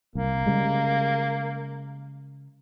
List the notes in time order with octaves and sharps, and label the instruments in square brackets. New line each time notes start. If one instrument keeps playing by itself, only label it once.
[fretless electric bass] C2 [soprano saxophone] A#3
[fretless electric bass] C#3 G3 G#3